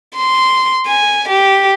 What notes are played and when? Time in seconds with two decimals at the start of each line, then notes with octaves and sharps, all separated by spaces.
0.16 C6
0.86 G#5
1.29 G4